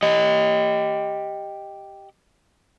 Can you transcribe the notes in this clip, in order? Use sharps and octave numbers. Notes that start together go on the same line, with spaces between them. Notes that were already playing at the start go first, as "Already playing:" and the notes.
G4 D#5